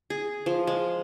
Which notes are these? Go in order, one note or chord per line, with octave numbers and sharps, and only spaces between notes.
G#4
F3
G#3